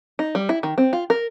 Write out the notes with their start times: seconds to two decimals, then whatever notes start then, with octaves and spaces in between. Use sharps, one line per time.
0.19 D#4
0.35 G3
0.49 E4
0.63 D#3
0.78 C4
0.93 F4
1.10 A#4